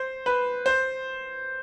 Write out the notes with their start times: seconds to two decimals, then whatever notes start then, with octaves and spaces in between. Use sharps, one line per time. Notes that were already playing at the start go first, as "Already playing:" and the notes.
Already playing: C5
0.26 B4
0.66 C5